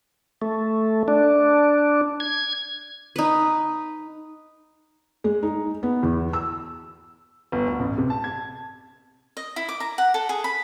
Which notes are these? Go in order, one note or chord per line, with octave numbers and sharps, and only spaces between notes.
A3
D4
G#6
D#4 B4
G#3
D#4
B3
E2
E6
G1
D2
A1
C3
A5
G#6
D#5
E4
D6
A#5
F#5
A4
G#4
B5